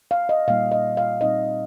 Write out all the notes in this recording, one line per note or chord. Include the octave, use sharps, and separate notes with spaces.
F5
D#5
A#2 G3 A#3 D#4 F5
D#5
F5
A#2 G3 C4 D#4 D#5